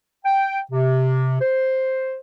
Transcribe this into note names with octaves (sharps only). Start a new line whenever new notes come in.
G5
C3
C5